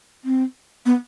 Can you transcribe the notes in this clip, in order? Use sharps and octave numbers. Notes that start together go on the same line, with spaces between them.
C4
B3